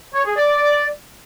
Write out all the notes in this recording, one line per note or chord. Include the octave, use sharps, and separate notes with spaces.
C#5
G#4
D5